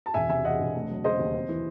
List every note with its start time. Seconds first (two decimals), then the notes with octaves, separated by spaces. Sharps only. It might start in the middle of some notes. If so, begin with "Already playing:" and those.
0.06 A5
0.14 E1 E5 G#5
0.29 C3 E5 G#5
0.45 E2 D#5 F#5
0.59 E1
0.75 A3
0.89 F#3
1.04 C#3 C5 D#5
1.19 D#2
1.34 C4
1.49 E3